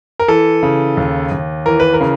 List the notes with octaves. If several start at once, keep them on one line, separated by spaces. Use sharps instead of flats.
A#4
E3 A4
C#3
D#2
D#2
E3 A#4
B4
A#4
C#3